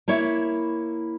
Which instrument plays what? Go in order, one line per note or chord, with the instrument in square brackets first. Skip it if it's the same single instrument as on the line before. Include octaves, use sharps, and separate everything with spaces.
[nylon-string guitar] A#3 E4 C#5 E5